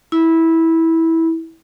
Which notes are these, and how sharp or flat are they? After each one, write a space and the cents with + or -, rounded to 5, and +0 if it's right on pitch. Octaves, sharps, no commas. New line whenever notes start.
E4 -15